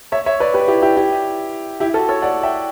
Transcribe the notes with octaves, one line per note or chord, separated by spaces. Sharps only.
C#5 E5
C#5 E5
B4 D5
G4 B4
E4 G4
E4 G4
E4 G4
E4 G4
F#4 A4
A4 C#5
D5 F#5
E5 G5